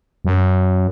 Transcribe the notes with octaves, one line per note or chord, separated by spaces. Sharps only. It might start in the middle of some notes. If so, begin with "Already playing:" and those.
F#2